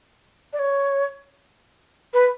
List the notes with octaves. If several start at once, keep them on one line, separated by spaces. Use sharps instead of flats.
D5
C#5
B4